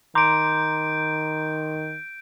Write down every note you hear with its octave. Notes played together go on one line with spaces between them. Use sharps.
D#3 A#5 C6 D6 G6 D7